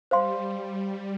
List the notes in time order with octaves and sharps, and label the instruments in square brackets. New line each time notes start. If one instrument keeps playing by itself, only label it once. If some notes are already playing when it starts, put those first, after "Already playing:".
[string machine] G3 [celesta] C5 F5 C6